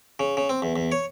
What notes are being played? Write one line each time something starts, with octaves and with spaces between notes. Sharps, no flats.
C#3
C#3
C4
E2
E2
C#5